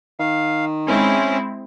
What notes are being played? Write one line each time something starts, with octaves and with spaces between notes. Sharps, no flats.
D#3 F5
G#3 C4 C#4 E4